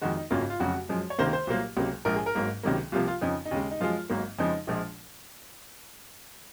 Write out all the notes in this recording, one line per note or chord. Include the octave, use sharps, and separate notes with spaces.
F2 D#3 G#3 F#4
D#4
G#1 F#2 C#3 F#3 A#3 F4
F4
F1 F2 C#3 F#3 F#4
F#2 F3 G#3
C#5
C#2 C3 D#3 A#3 C5
C5
C2 A#2 F#3 A#3
C#2 C3 F#3 A#3
A#1 G#2 F3 A#4
G#4
A#4
G#1 G#2 F#3 A#3
C#2 C3 D#3 F#3 A#3
C2 C3 F3 A#3 F4
F4
F2 C#3 F3 D#4
D#4
D#2 C#3 G#3
D#4
F#2 F3 G#3 F4
G#1 G#2 F#3 A#3
F2 C#3 F3 G#3 D#4
A#1 A#2 F3 G#3